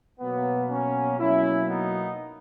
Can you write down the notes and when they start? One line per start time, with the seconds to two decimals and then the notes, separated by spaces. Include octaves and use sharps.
0.20 B2 F#3 A#3 B3
0.70 C#4
1.19 B2 F#3 A#3 C#4 E4
1.68 B3 D#4